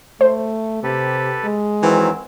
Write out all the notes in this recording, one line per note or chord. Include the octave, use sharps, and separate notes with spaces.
A3 C5
C3 G4 A4 B4
G#3
D#3 E3 F#3 C4